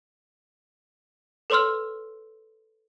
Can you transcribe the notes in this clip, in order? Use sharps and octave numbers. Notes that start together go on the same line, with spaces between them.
A4 B4 C#5 C6 E6 F6